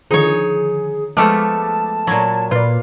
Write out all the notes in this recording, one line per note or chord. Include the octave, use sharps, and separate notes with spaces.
D3 D#3 F3 D#4 G#4 C#5
F3 G#3 A3 B3 A5 D6 F6
A#2 F#3 C#5 A#5 G#6
A#2 F4 B4 D5